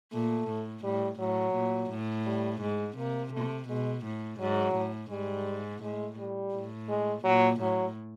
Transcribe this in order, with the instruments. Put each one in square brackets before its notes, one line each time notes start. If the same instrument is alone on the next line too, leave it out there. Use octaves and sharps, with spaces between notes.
[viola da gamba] A#2 [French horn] A3
[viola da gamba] A2
[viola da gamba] A2 [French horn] G3
[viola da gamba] A2 [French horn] F#3
[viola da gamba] A#2
A2
[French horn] G3
[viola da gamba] G#2 [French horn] G#3
[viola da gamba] C3 [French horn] A#3
[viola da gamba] C3 [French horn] A3
[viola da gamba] B2 [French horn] G#3
[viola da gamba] A2
[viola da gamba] G#2 [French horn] F#3
[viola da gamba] A2
[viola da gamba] G#2 [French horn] G3
[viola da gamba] A2 [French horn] G#3
[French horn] G3
[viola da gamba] A2
[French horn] G#3
[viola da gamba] A#2 [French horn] F#3
[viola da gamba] A2 [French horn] F#3